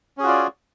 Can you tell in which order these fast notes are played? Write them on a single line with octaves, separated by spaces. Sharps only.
C#4 G#4 F#4 F4 D5